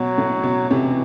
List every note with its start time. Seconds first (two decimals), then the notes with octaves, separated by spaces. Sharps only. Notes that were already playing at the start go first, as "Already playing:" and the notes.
Already playing: B2 F#3
0.18 A2
0.43 B2
0.70 A2 C3 E3